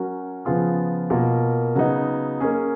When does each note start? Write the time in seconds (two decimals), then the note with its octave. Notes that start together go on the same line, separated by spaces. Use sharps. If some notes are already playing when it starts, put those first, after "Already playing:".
Already playing: F#3 C#4 F#4 A#4
0.45 C#3 F3 B3 F4 G#4
1.10 B2 A#3 F4 A#4
1.75 C#3 F#3 B3 D#4
2.40 A#3 C#4 G#4